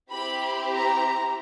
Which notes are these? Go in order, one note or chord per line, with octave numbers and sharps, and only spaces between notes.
C4 E4 G4 B5
A#5